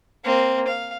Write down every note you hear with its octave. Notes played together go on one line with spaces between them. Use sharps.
A#3 C4
F5